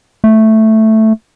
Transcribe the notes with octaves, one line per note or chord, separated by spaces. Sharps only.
A3